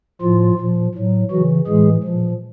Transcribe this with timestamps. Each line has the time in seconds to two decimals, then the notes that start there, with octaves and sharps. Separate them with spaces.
0.21 A2 F3 F4
0.58 A#2 F3
0.95 A2 F#3
1.31 C#3 E3 F#3 F#4
1.67 A2 E3 G#3 G#4
2.04 A#2 F3